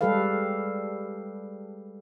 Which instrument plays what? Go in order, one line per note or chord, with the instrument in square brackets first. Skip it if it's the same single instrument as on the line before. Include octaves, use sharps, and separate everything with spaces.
[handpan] G3 G#3 G4 A4 B4 F5